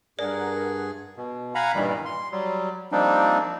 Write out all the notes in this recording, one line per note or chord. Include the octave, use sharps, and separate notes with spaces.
G2 G#4 A#4 D5 F#5
B2
F5 F#5 G#5 A#5 B5
G2 A#2 D#3 E3 G3
C6
F#3 G3
F3 G3 A#3 C4 D4 D#4